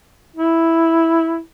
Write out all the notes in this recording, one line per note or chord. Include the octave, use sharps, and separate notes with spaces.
E4